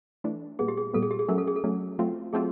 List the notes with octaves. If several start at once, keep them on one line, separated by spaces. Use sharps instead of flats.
E3 A3 D4
A#2 G3 B3 G#4
G4
G#4
A#2 G3 B3 A4
G#4
G4
G#4
F#3 A3 C#4 A#4
A4
G#4
A4
F#3 A3 C#4
F#3 A3 C4 F4
F#3 A3 C4 F4 G#4